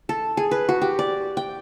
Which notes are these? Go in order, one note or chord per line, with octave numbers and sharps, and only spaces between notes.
A4
G#4
B4
F#4
G4
D5
G5